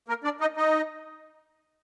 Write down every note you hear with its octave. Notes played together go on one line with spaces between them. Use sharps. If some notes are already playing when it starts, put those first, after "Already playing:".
A#3 A#4
D4 D5
D#4 D#5
D#4 D#5